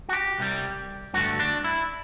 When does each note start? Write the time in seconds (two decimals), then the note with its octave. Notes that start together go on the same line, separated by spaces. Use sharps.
0.09 F#4
0.13 G4
0.38 C2 C3 G3
1.14 G2 D3 A3 F#4
1.40 D4
1.64 E4